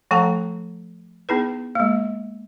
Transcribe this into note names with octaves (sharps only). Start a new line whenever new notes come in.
F3 A3 A4 G5 A5 A#5
B3 D#4 E4 G#4 B4
G#3 A#3